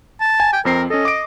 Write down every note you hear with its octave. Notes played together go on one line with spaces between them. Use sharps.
A5
G#5
G5
F2 C4 A#4 C7
C#4 A4 D#5
D6 D7